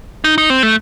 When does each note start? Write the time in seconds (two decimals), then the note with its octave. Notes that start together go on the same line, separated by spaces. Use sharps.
0.24 D#4
0.38 D#4
0.50 C4
0.63 A3